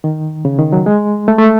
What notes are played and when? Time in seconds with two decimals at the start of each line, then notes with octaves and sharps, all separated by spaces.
0.04 D#3
0.45 C#3
0.59 D#3
0.73 F#3
0.86 G#3
1.28 A3
1.38 A3